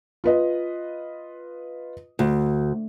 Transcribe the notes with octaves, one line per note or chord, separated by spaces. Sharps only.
F4 B4 D#5
D2